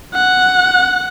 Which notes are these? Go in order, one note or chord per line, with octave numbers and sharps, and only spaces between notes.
F#5